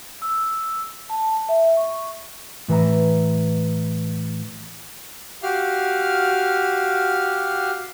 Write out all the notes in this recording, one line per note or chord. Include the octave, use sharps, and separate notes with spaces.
E6
A5
A5
E5
C#6
A2 E3 B4 E5 A#5
F#4 G4 F5 F6